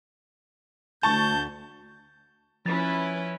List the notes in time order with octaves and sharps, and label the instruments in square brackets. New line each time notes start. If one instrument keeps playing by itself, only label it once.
[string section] D2 [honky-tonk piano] A5 C#6 [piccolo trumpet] G6
[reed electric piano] F3 A6 [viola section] C#4 E4 B4